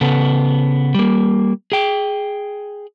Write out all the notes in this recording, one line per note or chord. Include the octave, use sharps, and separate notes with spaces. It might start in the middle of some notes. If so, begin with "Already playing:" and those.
C#3 B3 A4
G3 A#3
G#4 G5